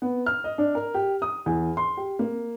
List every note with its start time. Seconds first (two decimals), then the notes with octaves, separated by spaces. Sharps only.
0.02 B3
0.26 F6
0.44 D#5
0.58 D4
0.75 A#4
0.94 G4
1.22 D#6
1.46 E2
1.77 C6
1.97 G4
2.19 A#3